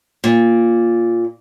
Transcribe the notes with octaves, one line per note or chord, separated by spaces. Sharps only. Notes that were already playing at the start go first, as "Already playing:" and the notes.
A#2